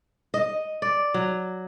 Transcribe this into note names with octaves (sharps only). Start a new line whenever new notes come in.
D#5
D5
F#3